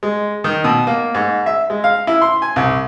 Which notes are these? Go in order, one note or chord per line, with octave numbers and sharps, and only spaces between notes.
G#3
D#3
B2
A#3
G#2
E5
G#3
F5
E4
C6
G#5
C2